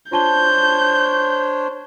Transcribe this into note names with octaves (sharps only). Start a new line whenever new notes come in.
D4 F4 C5 C#5 A5 G6 G7